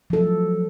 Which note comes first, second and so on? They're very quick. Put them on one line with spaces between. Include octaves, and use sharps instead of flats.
F3 A4 F#3